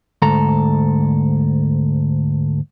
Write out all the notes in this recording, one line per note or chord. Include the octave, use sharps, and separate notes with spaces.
D2 G#2 A4 A#5